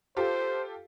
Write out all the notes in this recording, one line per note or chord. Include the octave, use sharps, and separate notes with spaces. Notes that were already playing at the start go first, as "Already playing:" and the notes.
F4 G4 A4 C5